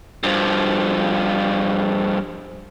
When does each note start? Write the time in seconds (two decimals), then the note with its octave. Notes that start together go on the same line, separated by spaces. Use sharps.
0.23 G2 F3